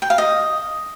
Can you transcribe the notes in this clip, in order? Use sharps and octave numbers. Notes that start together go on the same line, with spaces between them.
G5
F5
D#5